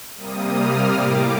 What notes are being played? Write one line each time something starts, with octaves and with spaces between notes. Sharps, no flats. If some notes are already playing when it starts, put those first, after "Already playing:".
C3 G3 A#3 D#6
F6
A2 G3 A#3 D6